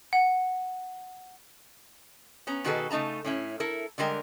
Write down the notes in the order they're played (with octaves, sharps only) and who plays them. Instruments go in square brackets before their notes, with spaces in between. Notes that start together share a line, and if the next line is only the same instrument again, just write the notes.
[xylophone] F#5
[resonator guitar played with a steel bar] B3 C#4 A#5
B2 D#3 F#4 G#4 A4 B4
C#3 A3 D#4 A5 A#5
A2 C#4 E4
E4 A4 A#4
D3 G3 G#3 A#4 G5